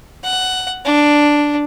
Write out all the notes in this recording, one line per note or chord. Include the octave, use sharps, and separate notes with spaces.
F#5
D4